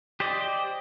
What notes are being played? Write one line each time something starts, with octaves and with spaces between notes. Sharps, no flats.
G4 C5 D5 D#5